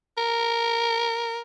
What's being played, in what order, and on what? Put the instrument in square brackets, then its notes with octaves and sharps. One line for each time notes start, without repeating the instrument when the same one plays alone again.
[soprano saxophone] A#4